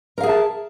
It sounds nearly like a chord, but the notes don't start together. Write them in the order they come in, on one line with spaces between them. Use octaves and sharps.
A#4 F5 G#4 E5 A5